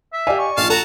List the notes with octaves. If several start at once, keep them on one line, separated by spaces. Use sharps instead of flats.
E5
G4 D5 D#5 F5 G#5
C#6
A#1 F4 F5 A5
F#4 A4 A5 A#5